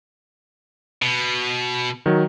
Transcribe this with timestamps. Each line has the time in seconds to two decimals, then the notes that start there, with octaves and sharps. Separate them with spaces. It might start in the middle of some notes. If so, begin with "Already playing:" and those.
1.02 B2
2.06 D#3 F#3